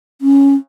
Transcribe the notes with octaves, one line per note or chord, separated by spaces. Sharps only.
C#4